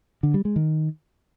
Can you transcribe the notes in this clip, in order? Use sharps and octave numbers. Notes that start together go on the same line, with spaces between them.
D3
G3
G#3
D#3